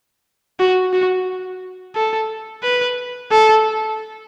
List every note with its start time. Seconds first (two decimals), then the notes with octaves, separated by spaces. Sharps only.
0.60 F#4
0.93 F#4
1.95 A4
2.63 B4
3.31 A4